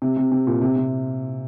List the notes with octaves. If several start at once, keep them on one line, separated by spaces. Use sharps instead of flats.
C3
C3
C3
A#2
C3
C3